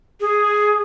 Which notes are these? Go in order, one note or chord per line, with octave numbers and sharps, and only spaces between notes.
G#4